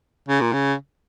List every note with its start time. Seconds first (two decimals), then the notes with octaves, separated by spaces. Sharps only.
0.28 C#3
0.41 A#2
0.53 C#3